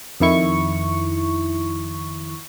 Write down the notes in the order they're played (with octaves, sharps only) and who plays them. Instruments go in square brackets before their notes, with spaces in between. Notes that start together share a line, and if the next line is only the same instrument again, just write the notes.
[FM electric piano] F2 D#3 E4 C#6